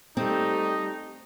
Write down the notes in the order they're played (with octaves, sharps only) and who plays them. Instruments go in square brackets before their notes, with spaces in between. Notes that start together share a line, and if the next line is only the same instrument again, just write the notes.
[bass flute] G3 [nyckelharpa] A3 G4 [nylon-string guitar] C4 [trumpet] D#4